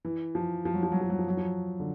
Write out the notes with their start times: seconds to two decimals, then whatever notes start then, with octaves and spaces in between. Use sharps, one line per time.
0.05 E3
0.35 F3
0.65 F3
0.74 F#3
0.83 F3
0.92 F#3
1.01 F3
1.10 F#3
1.19 F3
1.28 F#3
1.37 F3
1.80 D3